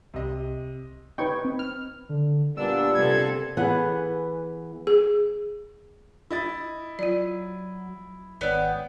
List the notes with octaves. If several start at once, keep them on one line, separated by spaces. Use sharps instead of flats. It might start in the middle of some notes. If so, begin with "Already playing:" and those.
C2 C3 D#5
D#4 B4 G5 C#6 G#6
C4
F6
D3
A#2 G3 B3 D4 E6
C3 A4 G#6
E3 B3 G#4 F#5
G#4
E4 D#5 A6
F#3 F4 D5
G#1 B3 C#5 D5 G5